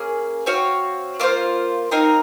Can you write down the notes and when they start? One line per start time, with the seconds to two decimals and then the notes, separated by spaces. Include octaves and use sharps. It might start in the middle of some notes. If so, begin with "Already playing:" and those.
Already playing: A#3 C#4 G#4
0.46 C4 F#4 C#5 F5
1.20 A#3 F4 C5
1.91 C4 D#4 A#4 F5